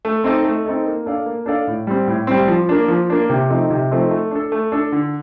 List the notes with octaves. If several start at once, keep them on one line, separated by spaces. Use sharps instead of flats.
A3
C4 D#4 A4 D#5
A3
C4 D#4 A4 D#5
A#3
D4 A4 D5 F5
A#3
D4 A4 D5 F5
A2
G3 C4
A2
G3 C4
F3
A#3 D4
F3
A#3 D4
C3
F3 A3 C4 D#4
C3
F3 A3 C4 D#4
A3
D4 A4
A3
D4 A4
D3